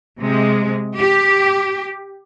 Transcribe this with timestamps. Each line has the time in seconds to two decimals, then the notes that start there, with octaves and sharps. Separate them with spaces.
0.21 C3 G#3
1.00 G4